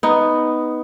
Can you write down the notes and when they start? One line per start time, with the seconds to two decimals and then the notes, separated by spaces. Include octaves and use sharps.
0.03 B3 D#4